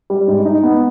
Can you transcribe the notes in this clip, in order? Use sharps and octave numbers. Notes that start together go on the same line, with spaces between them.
G3
G#2
D#4
B3